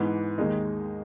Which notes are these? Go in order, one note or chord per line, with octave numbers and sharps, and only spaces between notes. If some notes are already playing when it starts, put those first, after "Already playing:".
Already playing: G#2 E3 B3
D#2 D#3 G#3 D#4